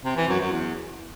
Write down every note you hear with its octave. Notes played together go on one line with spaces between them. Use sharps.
C3
E3
F#2
F#2
E2